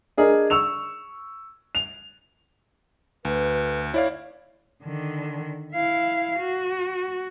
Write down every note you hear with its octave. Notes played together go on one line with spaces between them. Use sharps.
D4 G#4 A#4 D#5
C#6 E6 F7
F7
D2 B4
E4 C#5 D5 F5
D3 D#3
E4 F5
F#4